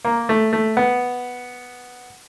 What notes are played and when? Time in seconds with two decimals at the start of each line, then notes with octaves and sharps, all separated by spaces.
0.05 A#3
0.29 A3
0.53 A3
0.77 B3